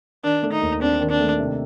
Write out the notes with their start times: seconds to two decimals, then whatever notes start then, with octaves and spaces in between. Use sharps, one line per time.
0.24 D#3 D4
0.43 A3
0.52 D#4
0.62 D#2
0.82 C4 D4
1.01 D#3
1.10 D4
1.20 A3
1.39 C3